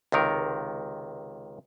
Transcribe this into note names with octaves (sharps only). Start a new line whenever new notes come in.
C#2 C3 D#3 A#4